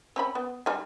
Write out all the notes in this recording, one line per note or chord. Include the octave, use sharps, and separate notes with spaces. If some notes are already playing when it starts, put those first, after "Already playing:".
C4 C#4 B5
B3
G3 D#4 G#5